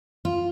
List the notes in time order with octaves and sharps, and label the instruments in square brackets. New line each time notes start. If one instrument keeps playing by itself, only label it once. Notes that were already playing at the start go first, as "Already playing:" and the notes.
[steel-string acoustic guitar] F4